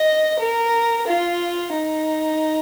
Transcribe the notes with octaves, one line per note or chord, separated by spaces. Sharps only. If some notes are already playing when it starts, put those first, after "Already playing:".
Already playing: D#5
A#4
F4
D#4